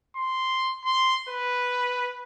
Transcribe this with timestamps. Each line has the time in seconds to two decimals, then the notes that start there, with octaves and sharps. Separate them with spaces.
0.16 C6
0.85 C6
1.29 B4